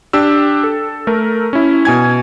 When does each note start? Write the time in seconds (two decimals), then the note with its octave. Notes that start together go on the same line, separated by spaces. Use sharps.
0.13 D4 G4 E6
0.64 A4
1.07 A3 A#4
1.53 C#4 E4
1.85 B2 G#5 G#6